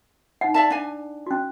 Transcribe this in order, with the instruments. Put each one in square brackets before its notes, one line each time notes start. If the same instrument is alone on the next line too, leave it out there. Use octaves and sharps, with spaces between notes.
[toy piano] D#4 F#5
[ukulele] D5 E5 A5
D4 G#5
[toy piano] C#4 F#4